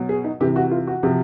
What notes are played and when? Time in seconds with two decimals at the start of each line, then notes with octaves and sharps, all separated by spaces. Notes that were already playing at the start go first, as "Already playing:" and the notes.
Already playing: B2 F#3
0.09 G#4
0.24 D#4
0.41 C3 E3 G4
0.56 F#4
0.71 F4
0.87 F#4
1.03 C3 F3